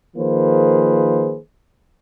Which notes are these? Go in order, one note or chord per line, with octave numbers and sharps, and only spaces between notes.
D#3 F3 A#3 G#4 B4 C5